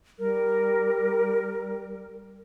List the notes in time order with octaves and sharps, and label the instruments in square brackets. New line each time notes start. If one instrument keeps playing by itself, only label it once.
[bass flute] G3 [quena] A#4